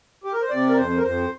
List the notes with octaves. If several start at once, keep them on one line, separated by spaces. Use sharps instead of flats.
G4
A#4
C5
C3 D5
A#4
F2 C5
A#4
F2 C5